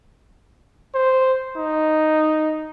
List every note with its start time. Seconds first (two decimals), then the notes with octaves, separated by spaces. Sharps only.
0.95 C5
1.57 D#4